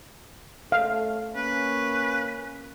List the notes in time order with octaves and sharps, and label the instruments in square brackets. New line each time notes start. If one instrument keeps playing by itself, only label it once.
[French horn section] A3 C#4 A4 [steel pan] F5
[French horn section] A#3 [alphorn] C#4 [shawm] B4